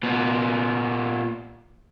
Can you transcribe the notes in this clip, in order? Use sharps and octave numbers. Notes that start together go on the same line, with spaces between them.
A#2 B3